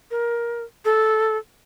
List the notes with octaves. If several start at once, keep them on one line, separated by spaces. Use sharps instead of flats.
A#4
A4